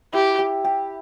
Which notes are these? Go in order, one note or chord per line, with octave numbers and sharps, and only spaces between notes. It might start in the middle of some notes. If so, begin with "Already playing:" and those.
E4 G4
G4
G4